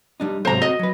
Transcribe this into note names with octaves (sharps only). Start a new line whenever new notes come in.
G3 D4 D#4
G#2 C3 F#3 C5 A#5
C4 F#4 D#5
F#3 B4